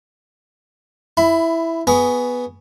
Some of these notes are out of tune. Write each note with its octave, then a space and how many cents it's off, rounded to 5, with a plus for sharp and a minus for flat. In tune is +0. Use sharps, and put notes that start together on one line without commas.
E4 +0 B5 +20
B3 +0 G#4 +0 C#6 +30